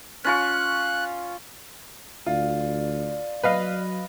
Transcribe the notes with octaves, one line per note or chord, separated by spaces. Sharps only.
C#4 F4 C#6 F#6
D2 F4 D5
F#3 B4 D#5 F5